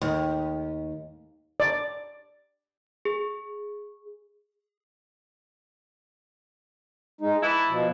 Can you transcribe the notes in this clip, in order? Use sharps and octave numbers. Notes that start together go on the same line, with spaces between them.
D#2
D5
G#4
G#3 D#4
E3 B3 E4 A5
B2 F3